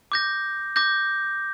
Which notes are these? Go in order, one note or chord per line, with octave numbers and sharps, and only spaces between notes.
D6 G6 A#6
D6 G6 A#6